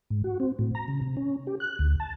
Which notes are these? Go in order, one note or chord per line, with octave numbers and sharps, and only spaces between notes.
G#2
F#4
C4
A2
A#5
C#3
C3
C#4
G4
F#6
D2
A5